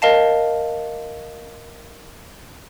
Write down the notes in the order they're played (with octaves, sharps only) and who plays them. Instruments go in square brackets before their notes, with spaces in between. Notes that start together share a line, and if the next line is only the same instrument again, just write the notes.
[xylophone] A#4 D#5 F5 A5